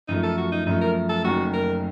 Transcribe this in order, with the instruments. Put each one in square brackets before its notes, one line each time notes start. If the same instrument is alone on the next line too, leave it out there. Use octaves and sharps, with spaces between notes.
[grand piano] F#2 F3 A3 [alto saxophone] D#4
[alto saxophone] A4
F#4
D#4
[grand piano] F#2 F3 A3 [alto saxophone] D#4
[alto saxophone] A#4
A4
[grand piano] F#1 F#2 D#3 A3 [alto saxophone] F#4
[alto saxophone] A#4